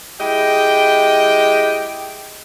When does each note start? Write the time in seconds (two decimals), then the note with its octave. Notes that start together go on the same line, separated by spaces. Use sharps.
0.21 G#3 E4 G4 D#5 G5